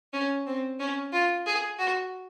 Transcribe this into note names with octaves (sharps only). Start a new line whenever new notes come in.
C#4
C4
C#4
F4
G#4
F#4